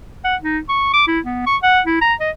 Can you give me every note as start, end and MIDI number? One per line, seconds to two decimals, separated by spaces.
0.24 0.36 78
0.42 0.59 63
0.69 0.92 85
0.94 1.02 86
1.07 1.19 64
1.25 1.45 59
1.46 1.56 85
1.63 1.80 78
1.86 1.99 64
2.01 2.14 82
2.20 2.30 75